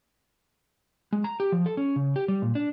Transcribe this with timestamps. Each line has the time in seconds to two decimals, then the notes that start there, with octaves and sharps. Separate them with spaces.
1.13 G#3
1.24 A#5
1.40 G4
1.52 F3
1.66 A4
1.77 C#4
1.96 C#3
2.16 G4
2.28 G3
2.42 A#2
2.55 D4